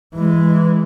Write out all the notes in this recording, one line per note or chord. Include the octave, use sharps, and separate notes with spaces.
E3 G#3